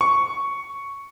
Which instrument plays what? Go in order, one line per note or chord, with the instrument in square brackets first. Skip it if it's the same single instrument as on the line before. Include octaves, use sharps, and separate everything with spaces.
[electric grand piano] C#6